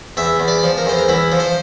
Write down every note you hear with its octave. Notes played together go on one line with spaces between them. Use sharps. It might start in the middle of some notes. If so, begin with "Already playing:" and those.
E2 E5
E2
D5
F3
A#4
E2 C5
A#4
E2 E4
F3
C5